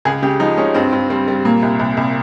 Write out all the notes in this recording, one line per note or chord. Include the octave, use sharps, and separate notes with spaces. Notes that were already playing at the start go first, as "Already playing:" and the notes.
C#2 G#4
C#3 G4
F3 D#4
G#3 C#4
G2 C4
G2
G3 C4
G3
A#2 A#3
C2
C2
C2